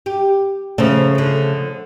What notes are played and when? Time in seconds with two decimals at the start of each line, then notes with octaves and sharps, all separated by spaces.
0.06 G4
0.78 C#3 F3 A3 A#3 A4
1.15 D3 F3